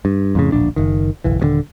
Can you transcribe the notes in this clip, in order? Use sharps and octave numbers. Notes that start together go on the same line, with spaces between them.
G2
F2 A2 C#3
D1 A#1 D4
F#1 D#3
F#1 B1 E3
D#1 B2 D3